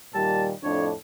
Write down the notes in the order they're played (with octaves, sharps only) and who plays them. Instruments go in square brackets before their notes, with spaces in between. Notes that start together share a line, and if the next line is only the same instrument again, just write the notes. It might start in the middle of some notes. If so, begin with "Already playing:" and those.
[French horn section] A#2 D#3 G3 [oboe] A5
[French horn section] F2 A2 D4 [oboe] C#5